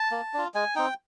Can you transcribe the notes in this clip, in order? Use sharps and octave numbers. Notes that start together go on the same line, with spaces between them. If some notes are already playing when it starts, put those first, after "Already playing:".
Already playing: A5
A#3
D4 F4
G#3 G#5
C4 D#4 G5